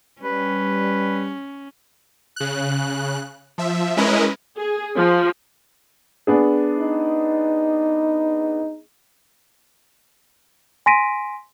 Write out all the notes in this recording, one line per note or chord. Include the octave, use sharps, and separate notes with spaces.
G3 C#4 B4
C#3 F#6
F3 E5
G#3 C#4 E4 A#4 B4 D#5
G#4
F3
B3 D4 G#4
D#4
G#5 C6 A#6 B6 D7 D#7